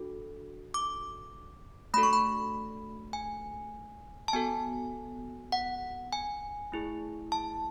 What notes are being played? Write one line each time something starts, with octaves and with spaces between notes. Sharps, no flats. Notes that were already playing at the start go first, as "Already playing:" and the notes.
Already playing: D4 F#4 A4
D6
A3 D4 F#4 A4 B5
C#6
B5
G#5
A5
B3 F#4 A4 G#5
F#5
G#5
A3 E4 G#4
A5